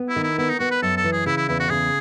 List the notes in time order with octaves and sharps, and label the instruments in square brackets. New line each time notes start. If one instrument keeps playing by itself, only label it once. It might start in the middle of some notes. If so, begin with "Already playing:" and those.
Already playing: [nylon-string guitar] B3
[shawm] E4
[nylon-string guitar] D#3
[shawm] E4
[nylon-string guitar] B3 [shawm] E4
[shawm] D#4
[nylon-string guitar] B3 [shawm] F#4
[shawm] B4
[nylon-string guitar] F#2 [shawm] A4
[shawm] A4
[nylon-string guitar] E3
[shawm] G#4
[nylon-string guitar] C#3 [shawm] E4
[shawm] E4
[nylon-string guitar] E2 [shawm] E4
[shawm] F#4
[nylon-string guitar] C#3 [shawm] G#4